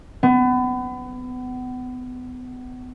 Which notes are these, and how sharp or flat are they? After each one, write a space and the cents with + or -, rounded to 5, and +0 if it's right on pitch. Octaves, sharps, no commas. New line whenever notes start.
B3 +30